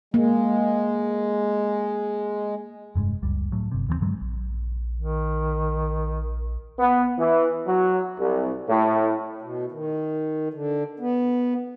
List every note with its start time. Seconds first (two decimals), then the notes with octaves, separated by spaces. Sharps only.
0.14 G#3 A#3
2.95 F1 G2 G#3
3.22 F#1 C#2 G3
3.52 A2 F#3
3.72 G1 C3
3.88 D#2 E3 G3 C4
4.01 G2 D3 F#3 G#3
4.22 A#1
4.97 D#3
6.79 B3
7.18 E3
7.66 F#3
8.19 C2
8.69 A2
9.42 B2
9.72 D#3
10.54 D3
11.00 B3